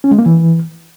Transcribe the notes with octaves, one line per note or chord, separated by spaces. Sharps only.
C#4
G#3
A#3
E3